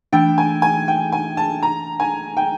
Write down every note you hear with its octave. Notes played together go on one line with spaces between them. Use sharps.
E3 A3 D4 G5
G#5
G#5
G5
G#5
A5
A#5
G#5
G5